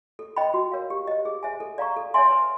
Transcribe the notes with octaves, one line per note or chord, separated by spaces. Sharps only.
A4
C5 D#5 G5 B5
F#4
A#4 C#5 F5
G4
C5 D#5
G#4
C5 E5 G#5
A4
D5 F5 A#5 C#6
A4
C#5 E5 G#5 C6
B4